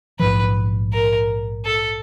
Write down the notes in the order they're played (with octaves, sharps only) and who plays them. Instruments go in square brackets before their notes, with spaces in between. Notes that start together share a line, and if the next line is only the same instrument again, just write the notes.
[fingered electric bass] A#1 G#2 F3 [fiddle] B4
[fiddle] A#4
A4